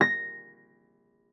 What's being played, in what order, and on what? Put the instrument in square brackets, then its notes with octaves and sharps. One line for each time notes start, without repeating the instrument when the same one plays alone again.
[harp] A#6